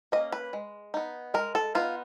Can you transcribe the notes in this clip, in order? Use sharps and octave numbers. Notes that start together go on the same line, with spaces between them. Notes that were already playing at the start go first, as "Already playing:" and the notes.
A#3 C#4 D#5
B4
G#3
B3 D#4
G#3 A#4
A4
B3 D#4 F4